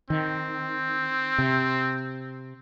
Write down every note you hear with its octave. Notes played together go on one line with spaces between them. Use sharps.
D#3 C4
C3